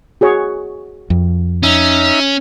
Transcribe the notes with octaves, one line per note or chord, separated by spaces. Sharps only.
F#4 G#4 C#5
F2
C#4 D#4 E5